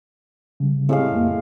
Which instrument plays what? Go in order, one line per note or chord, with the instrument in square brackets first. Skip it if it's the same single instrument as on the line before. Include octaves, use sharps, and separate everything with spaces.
[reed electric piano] C#3 G3
[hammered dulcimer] A2 G#3 F5 [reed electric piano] C4 G4
[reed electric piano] F2 A#3